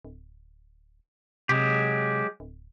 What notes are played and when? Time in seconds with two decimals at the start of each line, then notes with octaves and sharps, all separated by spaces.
0.05 D1
1.49 C3 F#3 G#3 G4
2.40 D1